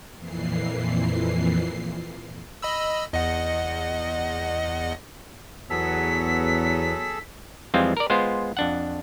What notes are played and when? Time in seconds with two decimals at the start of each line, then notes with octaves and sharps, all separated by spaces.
0.15 F2 A#2 E3 C7
2.62 D#5 B5 E6
3.13 E2 D#5 F#5
5.70 E2 F#3 B3 G#4 A4 E6 B6
7.74 F2 E3 G3 G#3 C4 F4
7.97 A#4 D5
8.10 G#3 B3 F4 C5
8.57 F2 D4 F#5